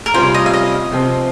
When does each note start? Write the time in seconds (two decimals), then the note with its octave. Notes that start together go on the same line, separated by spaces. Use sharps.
0.06 A#4
0.14 C3 G3 C#4 F4 C5
0.34 D#5
0.46 F5
0.54 D#5
0.92 C3 F3 C4